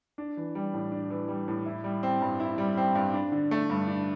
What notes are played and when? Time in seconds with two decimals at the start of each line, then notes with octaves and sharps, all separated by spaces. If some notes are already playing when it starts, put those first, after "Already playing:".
0.18 D4
0.37 E3
0.55 G3
0.74 A2
0.92 D4
1.10 E3
1.28 G3
1.48 A2
1.66 E4
1.84 G3
2.03 C4
2.21 G2
2.40 E4
2.58 G3
2.77 C4
2.95 G2
3.14 D4
3.32 D3
3.51 A3
3.70 G2
3.87 D4